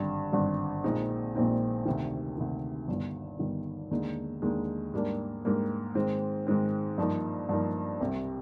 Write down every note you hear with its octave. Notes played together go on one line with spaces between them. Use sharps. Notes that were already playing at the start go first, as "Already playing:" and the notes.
Already playing: G#1 G2 D3 G3
G#1 G2 D3 G3
A#1 A#2 G#3 C4 D#4
A#1 A#2 G#3 C4 D#4
D2 C3 D#3
D2 C3 D#3
G1 G2 D#3
G1 G2 D#3
D#2 D3 G#3 D#4
D#2 D3 G#3 D#4
G#2 G3 A#3 D4
G#2 G3 A#3 D4
G#2 D#3 G#3 C4
G#2 D#3 G#3 C4
G2 F3 A#3 D#4
G2 F3 A#3 D#4
C2 C3 G3